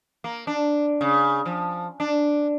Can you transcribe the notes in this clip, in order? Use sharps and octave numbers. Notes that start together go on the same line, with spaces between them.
A#3
D4
C#3
F3
D4